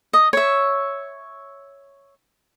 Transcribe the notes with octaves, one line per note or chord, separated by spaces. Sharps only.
D#5
C#5 E5